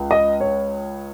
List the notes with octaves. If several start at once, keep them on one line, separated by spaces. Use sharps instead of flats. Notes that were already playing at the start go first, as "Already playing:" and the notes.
Already playing: C#2
D#5
C#5